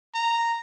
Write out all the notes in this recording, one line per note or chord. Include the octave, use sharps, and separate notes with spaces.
A#5